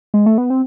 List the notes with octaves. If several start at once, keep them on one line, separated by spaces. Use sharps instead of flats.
G#3
A3
B3
C4